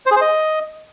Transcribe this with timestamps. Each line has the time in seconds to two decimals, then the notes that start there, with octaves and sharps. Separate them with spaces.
0.06 C5
0.11 G#4
0.16 C5
0.21 D#5